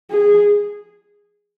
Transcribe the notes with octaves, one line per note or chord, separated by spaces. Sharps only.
G#4